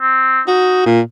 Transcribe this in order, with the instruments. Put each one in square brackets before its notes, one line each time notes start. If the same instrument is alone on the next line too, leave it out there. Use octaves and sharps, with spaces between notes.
[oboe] C4
[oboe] D#4 [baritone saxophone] F#4
[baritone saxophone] A#2